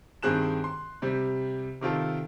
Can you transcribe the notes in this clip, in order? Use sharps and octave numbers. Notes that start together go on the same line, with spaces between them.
G2 D#3 C4 G#4 F#6 E7
C6
C3 G3
C3 D#3 F4 A4